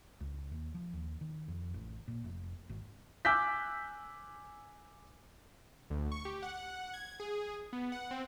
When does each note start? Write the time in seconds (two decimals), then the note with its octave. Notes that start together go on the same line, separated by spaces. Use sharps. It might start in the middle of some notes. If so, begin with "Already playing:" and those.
0.21 C#2
0.52 D#2
0.75 F3
0.93 D#2
1.21 D#3
1.48 F2
1.74 A1
2.08 A#2
2.24 F1
2.70 G#1
3.25 G#5 D6 E6 F#6 G6 B6
5.90 D2
6.12 C#6
6.25 G4
6.43 F#5
6.94 G#6
7.20 G#4
7.73 B3
7.92 F#5
8.11 C4